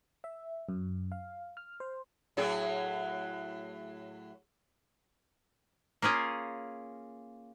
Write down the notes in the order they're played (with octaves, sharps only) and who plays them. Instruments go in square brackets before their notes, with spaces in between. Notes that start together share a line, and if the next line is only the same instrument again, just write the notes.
[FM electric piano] E5
F#2
F5
F6
C5
[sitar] A2 F#3 G#4
[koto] A#3 C#4 F4 G#4